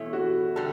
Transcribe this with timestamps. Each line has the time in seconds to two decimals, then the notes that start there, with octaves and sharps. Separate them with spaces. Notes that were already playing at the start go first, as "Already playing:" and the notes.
Already playing: E2 B2 A3 C#4 E4
0.13 F#4
0.56 D3 G3 A4